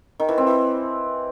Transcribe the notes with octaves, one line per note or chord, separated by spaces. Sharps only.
D#3
E3
C4
E3